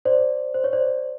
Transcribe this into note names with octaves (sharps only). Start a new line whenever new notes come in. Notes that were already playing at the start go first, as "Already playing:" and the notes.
C5 D5
C5
C#5
C5 D5